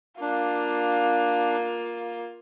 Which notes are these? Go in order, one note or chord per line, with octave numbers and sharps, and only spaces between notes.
A#3 D4 F4